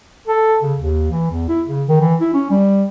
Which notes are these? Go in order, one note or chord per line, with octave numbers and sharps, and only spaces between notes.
A4
C#3
D#2
E3
E2
E4
C#3
D#3
E3
E4
C#4
G3